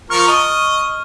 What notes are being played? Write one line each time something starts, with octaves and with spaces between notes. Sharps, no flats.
F3 A#4 C#6 F6
D#5 C#6